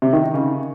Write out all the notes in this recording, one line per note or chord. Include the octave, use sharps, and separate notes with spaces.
C3
D#3
D#4
C#3